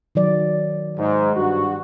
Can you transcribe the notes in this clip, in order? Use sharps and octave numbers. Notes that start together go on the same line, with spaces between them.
D#3 F#3 D5
G#2
G2 F#4